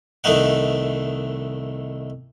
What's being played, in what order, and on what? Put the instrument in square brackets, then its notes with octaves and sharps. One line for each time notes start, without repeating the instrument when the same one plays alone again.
[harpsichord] C2 D#3 A3 D#4 F#5